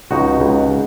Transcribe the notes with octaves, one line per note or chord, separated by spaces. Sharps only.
C#2 D#4 F#4
C#2